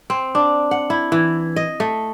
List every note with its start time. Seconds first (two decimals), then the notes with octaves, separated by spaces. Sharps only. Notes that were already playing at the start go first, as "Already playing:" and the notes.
0.10 C4
0.35 D4
0.71 F#5
0.90 E4
1.12 E3
1.56 D#5
1.80 A3